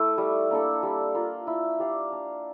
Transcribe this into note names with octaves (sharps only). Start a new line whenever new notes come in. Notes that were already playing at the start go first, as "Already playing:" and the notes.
Already playing: A3 E4
G3
A#3 D4 A4
G3
A#3 F4
E4
G4 D5 F5
D4